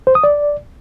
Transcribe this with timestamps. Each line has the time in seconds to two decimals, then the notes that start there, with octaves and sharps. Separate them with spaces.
0.07 C5
0.15 D#6
0.24 D5